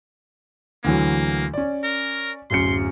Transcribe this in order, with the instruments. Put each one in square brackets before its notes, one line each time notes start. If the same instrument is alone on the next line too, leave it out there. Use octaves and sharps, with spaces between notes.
[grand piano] D2 E3 F#3 [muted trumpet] A#3
[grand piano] C#4 D5
[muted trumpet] A#4
[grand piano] D1 F#2 C#7 [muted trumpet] C6